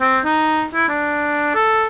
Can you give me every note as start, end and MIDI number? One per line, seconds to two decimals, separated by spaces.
0.01 0.19 60
0.25 0.64 63
0.74 0.88 64
0.89 1.50 62
1.54 1.87 69